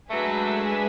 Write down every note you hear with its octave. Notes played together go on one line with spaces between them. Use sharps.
F#3 G#3 A3 D4 G#4 B4 E5